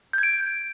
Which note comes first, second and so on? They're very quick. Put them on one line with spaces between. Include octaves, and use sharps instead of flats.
G6 G#6 D7